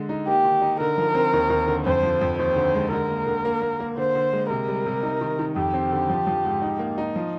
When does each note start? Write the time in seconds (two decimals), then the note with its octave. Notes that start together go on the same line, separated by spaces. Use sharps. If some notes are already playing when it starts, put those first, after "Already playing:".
Already playing: D3 G#3
0.09 D#4
0.27 A#3 G4
0.44 D#3
0.61 D#4
0.80 D3 A#4
0.98 F3
1.14 C4
1.33 D#2
1.50 D#2
1.67 D3
1.85 F2 C5
2.03 F3
2.21 F2
2.38 D#2 C5
2.56 D3
2.74 G#3
2.91 D3 A#4
3.09 A#3
3.26 D3
3.45 A#3
3.61 A#3
3.80 A#3
3.97 D3 C5
4.15 D3
4.33 G#3
4.50 C3 A#4
4.68 G3
4.86 C3
5.03 D#4
5.21 D#3
5.39 D#3
5.56 F2 G4
5.74 C4
5.92 D3
6.09 F3
6.27 F3
6.45 G#2
6.62 D#4
6.79 A#3
6.98 D#4
7.16 F3